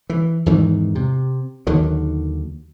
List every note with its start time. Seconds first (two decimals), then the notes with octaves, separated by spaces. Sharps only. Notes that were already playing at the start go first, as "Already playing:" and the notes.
0.10 E3
0.46 E2 G#2 D#3 E3
0.95 C3
1.67 D#2 D3 D#3 F#3